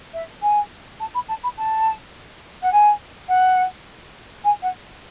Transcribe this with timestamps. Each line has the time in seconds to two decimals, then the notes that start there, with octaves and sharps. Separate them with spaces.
0.13 E5
0.42 G#5
1.00 A5
1.14 B5
1.28 A5
1.43 B5
1.57 A5
2.62 F#5
2.72 G#5
3.28 F#5
4.44 G#5
4.62 F#5